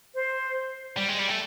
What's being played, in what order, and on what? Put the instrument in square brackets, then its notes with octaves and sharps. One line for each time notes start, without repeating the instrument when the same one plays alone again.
[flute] C5
[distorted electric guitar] G3
G#3
G3
A3